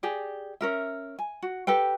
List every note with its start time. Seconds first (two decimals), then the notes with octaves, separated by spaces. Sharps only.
0.03 G4 G#4 D5
0.61 C#4 A#4 E5
1.19 G#5
1.42 F#4
1.67 G4 A4 B4 G5